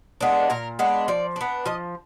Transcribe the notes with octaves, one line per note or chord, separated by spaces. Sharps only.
G#3 B3 D4
A#2 A#4
G#3 B3 D4
F3 D5
B3 D4
F3 D#5